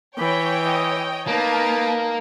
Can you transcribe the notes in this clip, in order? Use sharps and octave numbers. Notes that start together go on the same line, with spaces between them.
E3 C#5 G5 B5
D#5 D#6
A#3 D#4 B4 A5